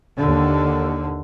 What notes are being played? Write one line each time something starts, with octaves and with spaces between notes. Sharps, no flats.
D#2 D3